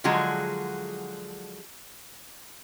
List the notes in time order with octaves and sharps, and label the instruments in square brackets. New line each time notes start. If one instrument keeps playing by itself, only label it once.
[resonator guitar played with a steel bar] D3 F3 F#3 G#3 F#4 G#4